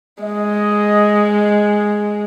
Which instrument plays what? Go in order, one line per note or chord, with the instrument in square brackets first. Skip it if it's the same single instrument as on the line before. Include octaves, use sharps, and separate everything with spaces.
[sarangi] G#3 [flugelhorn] D#5